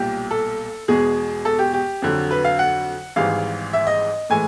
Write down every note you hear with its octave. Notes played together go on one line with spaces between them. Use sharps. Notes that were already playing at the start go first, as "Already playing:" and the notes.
Already playing: B1 A#2 G3 G4
A4
E2 B2 G#3 G#4
A4
G4
G4
F2 D3 F#3
B4
F5
F#5
G#1 G#2 E3 G3 F5
E5
D#5
A2 E3 G#3 G#5